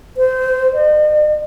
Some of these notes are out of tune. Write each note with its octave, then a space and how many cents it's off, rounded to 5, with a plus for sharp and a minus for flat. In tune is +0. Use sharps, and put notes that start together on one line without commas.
C5 -25
D#5 -45